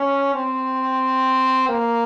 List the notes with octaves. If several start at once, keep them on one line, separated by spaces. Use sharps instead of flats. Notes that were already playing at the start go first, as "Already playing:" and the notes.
Already playing: C#4
C4
A#3